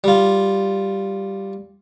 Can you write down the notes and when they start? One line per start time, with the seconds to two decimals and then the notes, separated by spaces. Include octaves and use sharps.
0.04 G3 F4